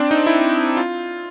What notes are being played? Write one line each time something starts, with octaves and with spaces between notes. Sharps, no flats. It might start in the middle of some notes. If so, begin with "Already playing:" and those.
Already playing: C4 D4
D#4
E4
F4